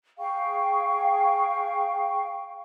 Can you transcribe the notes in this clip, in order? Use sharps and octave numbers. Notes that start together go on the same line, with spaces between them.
G#4 F5 G5 C#6